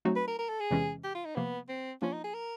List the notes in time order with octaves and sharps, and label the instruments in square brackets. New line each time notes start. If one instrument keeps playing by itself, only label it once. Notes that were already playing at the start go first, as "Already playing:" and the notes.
[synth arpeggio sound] F#3 A3 C4 D#4 F#4
[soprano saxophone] B4
A#4
A#4
A4
G#4
[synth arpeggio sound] E2 C3 E3 G#3 C#4
[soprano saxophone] G4
F4
D#4
[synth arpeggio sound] C3 F3 A#3 [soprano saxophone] B3
[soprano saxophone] C4
[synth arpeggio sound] F3 A#3 D4 F4 [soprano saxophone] C#4
[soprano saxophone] D#4
G#4
A#4